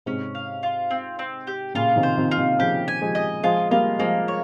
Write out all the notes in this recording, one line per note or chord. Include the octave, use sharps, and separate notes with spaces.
G#2 C3 C#4
F5
F4
C4
C4
G4
A#2 C#3 F4
C3 D#3
C5
C3 D#3
F4
C3 D#3
C#3 F3 G4
G#5
F3 G#3
D#5
F3 G#3 F4
G3 A#3 F4
F3 G#3 A#3
C#5